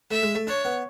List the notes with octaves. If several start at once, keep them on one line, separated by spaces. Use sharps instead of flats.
A3 E5
G#3
A3
D4 C#5
B3